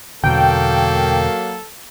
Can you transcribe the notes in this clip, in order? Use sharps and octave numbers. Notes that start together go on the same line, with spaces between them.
E2 B2 D3 F#3 A#3 A4 G5